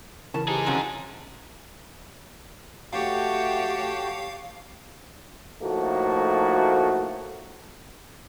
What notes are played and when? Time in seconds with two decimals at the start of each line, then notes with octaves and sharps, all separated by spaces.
0.34 C#3 E3 A#4 A5
0.48 D#4 G4 G#4
0.66 C3 F3 F#3 C#4
2.93 A3 F#4 G4 C#5 F5 G5 A5
5.62 A2 F3 A3 A#3 D#4 F#4